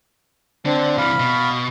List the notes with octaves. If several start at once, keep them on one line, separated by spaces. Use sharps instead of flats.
D3 C4 D4
C3 E3 F5 B5
B2